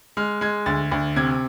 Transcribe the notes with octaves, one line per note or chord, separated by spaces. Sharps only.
G#3 F6
G#3 G#6
D2 A6
D2
C3 G#6